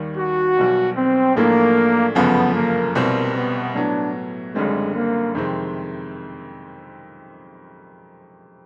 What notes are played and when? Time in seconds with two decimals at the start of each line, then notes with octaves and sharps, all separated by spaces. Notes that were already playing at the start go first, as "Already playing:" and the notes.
Already playing: D#2 D#3 G3
0.17 F#4
0.57 B1 B2 G3
0.96 C4
1.36 B1 A2 F3 A3 A#3 D4
2.15 G1 F#2 C#3 F3 A3 B3
2.55 A#3
2.95 C2 B2 G3 A#3 C4
3.35 B3
3.75 A2 F#3 B3 D4
4.54 F#1 F#2 D3 G3 G#3 C4
4.95 A#3
5.35 F2 C3 D#3 G#3 C4